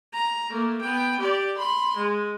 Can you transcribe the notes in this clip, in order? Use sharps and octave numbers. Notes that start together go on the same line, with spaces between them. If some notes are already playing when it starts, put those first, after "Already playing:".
A#5
A3 A#3
B3 G5
G4 D5
B5 C6
G#3